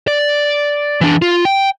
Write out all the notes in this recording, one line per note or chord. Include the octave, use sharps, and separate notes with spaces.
D5
E3 D4
F4
G5